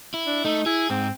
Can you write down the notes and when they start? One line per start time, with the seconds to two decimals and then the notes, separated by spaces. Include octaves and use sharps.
0.14 E4
0.26 D4
0.44 A3 D#4
0.66 E4 G#4
0.90 G#2 C4